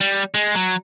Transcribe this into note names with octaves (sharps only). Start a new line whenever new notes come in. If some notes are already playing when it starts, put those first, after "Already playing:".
G3
G#3
F#3